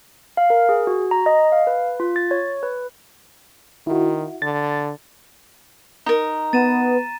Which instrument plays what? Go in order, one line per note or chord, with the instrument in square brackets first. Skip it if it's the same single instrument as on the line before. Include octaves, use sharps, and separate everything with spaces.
[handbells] F5
A#4
G#4
F#4
A#5
D#5
F5
B4
F4
A6
C#5
B4
[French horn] D#3 [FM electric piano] E4 F#4
[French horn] D3 [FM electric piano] A6
[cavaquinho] D#4 A#4 [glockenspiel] A#5
[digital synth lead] B3 [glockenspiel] A6 D#7 E7